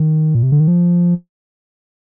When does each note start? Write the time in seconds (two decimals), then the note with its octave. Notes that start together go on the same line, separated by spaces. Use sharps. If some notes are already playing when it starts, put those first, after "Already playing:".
Already playing: D#3
0.35 A#2
0.43 C3
0.52 D3
0.60 D#3
0.68 F3